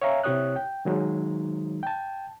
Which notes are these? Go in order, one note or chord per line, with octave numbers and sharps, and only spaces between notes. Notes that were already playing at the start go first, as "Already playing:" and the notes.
C#5 E5 F5 G#5 A#5
C3 E4 G4 C#5 D#6 F#6
G5
D#3 F#3 G#3 D#4
G5 A5